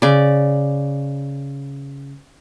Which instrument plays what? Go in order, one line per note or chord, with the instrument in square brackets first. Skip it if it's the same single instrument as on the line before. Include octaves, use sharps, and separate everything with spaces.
[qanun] C#3 D5